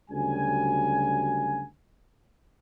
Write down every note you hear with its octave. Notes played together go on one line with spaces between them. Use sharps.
D2 C#3 F#3 G3 G#5